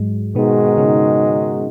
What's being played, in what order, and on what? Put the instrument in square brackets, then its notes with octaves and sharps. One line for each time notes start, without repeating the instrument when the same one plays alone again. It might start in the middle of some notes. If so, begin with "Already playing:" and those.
Already playing: [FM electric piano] G#2 F#3 G#3
[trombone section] G#2 D#3 G#3 D#4 F#4 [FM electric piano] B2 B3
[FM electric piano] B3
C#3 C#4